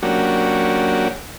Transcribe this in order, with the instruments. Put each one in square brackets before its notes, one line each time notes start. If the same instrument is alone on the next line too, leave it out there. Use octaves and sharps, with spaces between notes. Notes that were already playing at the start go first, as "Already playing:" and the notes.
[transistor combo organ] F#3 A#3 C#4 D4 F#4 G4